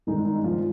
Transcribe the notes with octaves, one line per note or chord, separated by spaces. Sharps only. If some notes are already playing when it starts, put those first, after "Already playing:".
G2 D#3 G#3 D#4
D#4
F3 F4